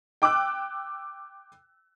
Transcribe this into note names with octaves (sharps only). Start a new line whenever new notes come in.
G5 D6 E6 F#6